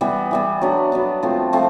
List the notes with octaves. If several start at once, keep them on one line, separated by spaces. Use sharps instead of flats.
E3 G3 B3
E3 G3 B3
F#3 B3 D4
F#3 B3 D4
F3 A3 C4 F4
F3 A3 C4 F4